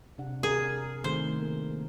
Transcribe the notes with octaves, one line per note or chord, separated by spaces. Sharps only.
C3 D4 F#5
D4 G#4 A#4
D#3 A3 C4 C5
A#3 A#4